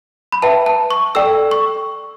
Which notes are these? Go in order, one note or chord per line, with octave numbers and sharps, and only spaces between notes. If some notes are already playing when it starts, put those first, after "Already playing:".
B5
B4 E5 G5 A5
A5
C#6
A4 D5 G5 E6
C#6